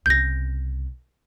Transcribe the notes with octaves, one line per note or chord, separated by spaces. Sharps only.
C2 C#3 G6 A#6